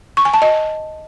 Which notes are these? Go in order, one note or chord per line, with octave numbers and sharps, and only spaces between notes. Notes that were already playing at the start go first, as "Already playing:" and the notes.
C#6
G#5
A5
D#5